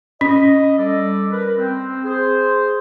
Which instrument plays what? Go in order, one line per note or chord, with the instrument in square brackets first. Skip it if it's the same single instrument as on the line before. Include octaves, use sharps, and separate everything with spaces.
[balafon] C#4 [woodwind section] D#5
[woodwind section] G3 A4 D5
A#4 B4
C4
G#4 C5